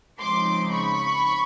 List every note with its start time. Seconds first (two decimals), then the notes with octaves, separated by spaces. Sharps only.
0.21 C#3 F3 G#3 C4 D#4 C6 D6
0.71 B5 C#6